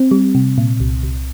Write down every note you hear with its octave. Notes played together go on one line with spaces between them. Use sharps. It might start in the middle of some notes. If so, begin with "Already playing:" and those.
Already playing: C4
G3
C3
A#2
C2
C2